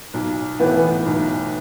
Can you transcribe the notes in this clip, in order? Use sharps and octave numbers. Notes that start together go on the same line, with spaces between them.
B1
A2 E3 B3 E4
B1